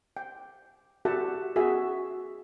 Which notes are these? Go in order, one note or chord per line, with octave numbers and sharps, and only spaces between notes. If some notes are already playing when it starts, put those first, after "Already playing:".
G5
F#4 G4 A4 E5 F#5 A5
F#4 G#4 E5